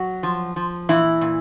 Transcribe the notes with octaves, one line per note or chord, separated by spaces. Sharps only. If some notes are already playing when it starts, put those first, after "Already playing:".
Already playing: F#3 F#4
F3
F3
A#2 E3 E4
A#2